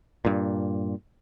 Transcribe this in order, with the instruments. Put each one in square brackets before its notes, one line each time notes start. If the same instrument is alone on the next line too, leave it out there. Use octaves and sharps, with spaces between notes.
[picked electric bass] G2 A#2